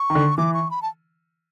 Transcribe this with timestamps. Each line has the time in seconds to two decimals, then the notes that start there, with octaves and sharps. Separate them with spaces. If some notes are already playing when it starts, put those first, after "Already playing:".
Already playing: C#6
0.10 D#3
0.15 D3
0.38 E3 D6
0.54 C#6
0.71 B5
0.82 A5